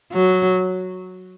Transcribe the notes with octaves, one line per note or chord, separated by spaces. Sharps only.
F#3